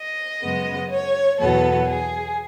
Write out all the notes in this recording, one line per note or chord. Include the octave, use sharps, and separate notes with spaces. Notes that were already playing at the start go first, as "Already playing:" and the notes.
Already playing: D#5
F#2 C#3 G#3 B3
C#5
E2 B2 F#3 B3 A4
G#4